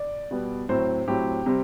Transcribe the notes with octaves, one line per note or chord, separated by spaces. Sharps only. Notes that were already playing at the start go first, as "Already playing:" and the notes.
Already playing: D5
B2 G3 B3
A2 F#3 C4 C5
A2 F#3 C4 G4
C3 G3 C4